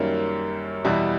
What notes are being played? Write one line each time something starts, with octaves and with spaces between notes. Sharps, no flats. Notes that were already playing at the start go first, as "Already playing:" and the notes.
Already playing: F#2 D#3 G3 A#3 C#4
E2 B2 G3 B3 E4